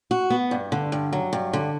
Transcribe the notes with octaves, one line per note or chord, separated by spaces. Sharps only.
F#4
B3
G2
D3
G2
F#3
G2
D3